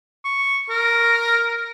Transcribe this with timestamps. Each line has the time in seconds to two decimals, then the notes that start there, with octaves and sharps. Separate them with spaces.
0.25 C#6
0.70 A#4